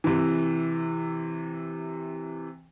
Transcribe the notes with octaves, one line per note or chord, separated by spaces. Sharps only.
C3 E3